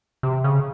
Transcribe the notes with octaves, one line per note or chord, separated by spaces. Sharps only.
C3
C#3